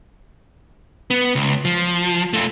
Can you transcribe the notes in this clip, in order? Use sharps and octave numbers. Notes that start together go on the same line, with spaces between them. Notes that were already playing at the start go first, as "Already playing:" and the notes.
B3
C#2
F3
A3 F4